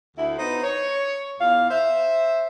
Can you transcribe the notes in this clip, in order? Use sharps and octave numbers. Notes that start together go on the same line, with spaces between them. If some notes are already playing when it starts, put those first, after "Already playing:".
D2 E4
B3 D#4 B4 C5
C#5
E2 F5
C5 E5